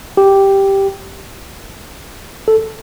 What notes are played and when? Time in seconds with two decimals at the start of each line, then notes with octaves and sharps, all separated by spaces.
0.17 G4
2.48 A4